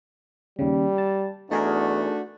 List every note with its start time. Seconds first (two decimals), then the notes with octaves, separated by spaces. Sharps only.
0.59 D#2 C#3 G3
0.98 A5
1.51 E2 A3 D4 D#4 F#4 G#4 A#4